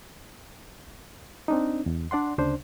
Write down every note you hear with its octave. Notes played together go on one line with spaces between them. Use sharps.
C4 D4 D#4
E2
D4 D5 F#5 C6
D2 C#3 D4 C5